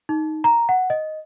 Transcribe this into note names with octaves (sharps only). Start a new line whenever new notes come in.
D#4
A#5
F#5
D#5